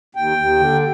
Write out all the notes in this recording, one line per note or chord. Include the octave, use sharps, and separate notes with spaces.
D#2 G5
D#2
D3